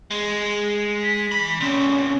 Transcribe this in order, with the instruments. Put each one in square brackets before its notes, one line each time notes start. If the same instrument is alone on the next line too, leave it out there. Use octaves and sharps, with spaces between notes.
[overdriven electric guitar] G#3
[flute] B6
[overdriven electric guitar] E3 B5
[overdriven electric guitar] A#2 C4 [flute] C#4